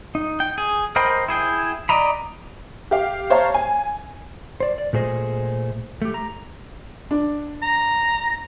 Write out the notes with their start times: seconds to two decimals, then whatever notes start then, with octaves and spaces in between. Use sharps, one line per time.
0.15 D#4
0.40 G5
0.58 G#4
0.96 A#4 C5 D#5 G5 B5
1.28 E4 G#4 G5
1.89 D5 D#5 A#5 B5
2.91 G4 F5
3.30 C5 C#5 F5 A5 A#5
3.54 G#5
4.60 C5 D5
4.78 D5
4.93 A#2 A3 G#4 C5 D#5
6.02 A3 G4
6.14 A#5
7.11 D4
7.62 A#5